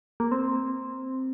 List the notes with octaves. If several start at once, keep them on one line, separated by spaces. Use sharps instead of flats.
A#3
C4